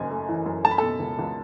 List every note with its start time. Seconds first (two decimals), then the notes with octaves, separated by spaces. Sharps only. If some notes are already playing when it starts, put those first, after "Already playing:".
Already playing: F#1 F#2 G#5
0.10 A3
0.29 E3
0.46 F#2
0.64 A3 A5
0.71 B5
0.78 B2 A4 A5
1.00 C#2
1.19 C#2